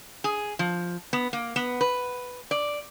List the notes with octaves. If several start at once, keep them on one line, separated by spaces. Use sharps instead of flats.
G#4
F3
B3
A#3
B3
B4
D5